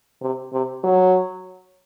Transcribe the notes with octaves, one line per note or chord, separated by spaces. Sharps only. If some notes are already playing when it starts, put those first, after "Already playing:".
C3
C3
F#3